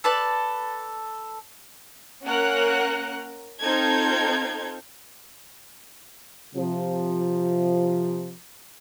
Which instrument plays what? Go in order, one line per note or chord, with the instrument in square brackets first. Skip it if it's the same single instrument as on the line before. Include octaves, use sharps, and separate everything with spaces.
[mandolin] A4 B4 D5 A5
[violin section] A#3 C#4 A#4 F#5 F#6
C4 D#4 F4 A4 G6 G#6
[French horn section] C3 F3